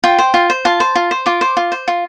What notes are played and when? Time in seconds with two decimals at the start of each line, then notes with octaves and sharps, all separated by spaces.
0.04 F4 G5
0.19 C5
0.34 F4
0.50 C5
0.65 F4 A5
0.80 C5
0.95 F4
1.11 C5
1.26 F4 D6
1.41 C5
1.57 F4
1.72 C5
1.88 F4